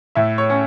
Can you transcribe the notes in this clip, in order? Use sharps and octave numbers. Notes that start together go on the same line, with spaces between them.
A2 E5
C#5
C#4